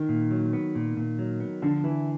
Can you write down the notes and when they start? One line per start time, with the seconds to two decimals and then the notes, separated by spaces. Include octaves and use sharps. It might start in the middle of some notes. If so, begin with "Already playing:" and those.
Already playing: D#3
0.09 A#2
0.31 F#3
0.53 B3
0.75 A#2
0.97 A#2
1.19 F#3
1.40 B3
1.62 D3 F3
1.84 E3 E4